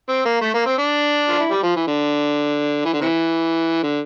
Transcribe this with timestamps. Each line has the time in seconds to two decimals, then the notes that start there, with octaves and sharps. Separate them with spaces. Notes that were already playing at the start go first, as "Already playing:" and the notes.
0.09 C4
0.25 A#3
0.42 A3
0.54 A#3
0.66 C4
0.78 D4
1.29 F4
1.40 E4
1.51 G3
1.63 F3
1.76 E3
1.88 D3
2.85 E3
2.93 D3
3.01 C3 E3
3.83 D3